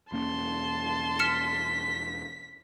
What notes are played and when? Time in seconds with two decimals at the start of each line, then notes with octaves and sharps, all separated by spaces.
0.12 E1 A#3 C#4 A5 C6
1.19 F6 B6 C#7 E7